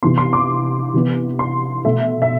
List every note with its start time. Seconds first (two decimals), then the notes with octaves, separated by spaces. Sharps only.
0.03 C3 E3 B3 C6
0.18 C6
0.33 D6
0.94 C3 E3 B3
1.39 C6
1.85 B2 A3 E5
2.22 E5